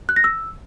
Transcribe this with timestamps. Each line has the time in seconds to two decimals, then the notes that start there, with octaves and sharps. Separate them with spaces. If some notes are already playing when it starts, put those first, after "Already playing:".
0.09 F#6
0.16 A#6
0.24 E6